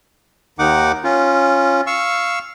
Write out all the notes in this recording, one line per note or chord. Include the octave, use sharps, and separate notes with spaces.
D#2 D#3 D#4 F#5 D6
C#4 F4
F5 C#6 E6